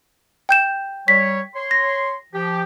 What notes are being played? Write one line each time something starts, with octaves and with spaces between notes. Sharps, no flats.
G5 G6 E7
G3 C#5 B6
C#5 C6
A#6
F3 G4